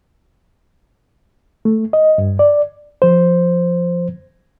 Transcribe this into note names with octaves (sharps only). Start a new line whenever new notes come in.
A3
D#5
G2
D5
F3 C5